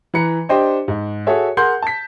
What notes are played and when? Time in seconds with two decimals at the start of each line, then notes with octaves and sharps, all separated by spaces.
0.14 E3 B4 A#5 C#7
0.49 D4 G4 C5 D#5 G5 C6
0.88 G#2
1.27 F#4 G#4 A4 C#5 E5
1.57 G#4 A#4 F#5 C6 G6
1.82 A5 B6